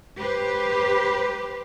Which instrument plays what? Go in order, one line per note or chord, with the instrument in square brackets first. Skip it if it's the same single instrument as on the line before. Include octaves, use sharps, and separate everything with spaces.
[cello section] G4 B4 C5